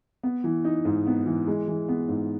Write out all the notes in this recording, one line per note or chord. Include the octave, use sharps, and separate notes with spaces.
B3
E3
D#4
G#2
B3
E3
G#3
E3
B3
G#2